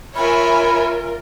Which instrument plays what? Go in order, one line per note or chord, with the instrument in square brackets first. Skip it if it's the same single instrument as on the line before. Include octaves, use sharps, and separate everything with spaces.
[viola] F4 A#4 [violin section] C#5 E5 G#5 [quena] B5